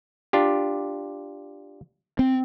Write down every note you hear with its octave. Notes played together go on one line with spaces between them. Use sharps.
D4 F4 G4
C4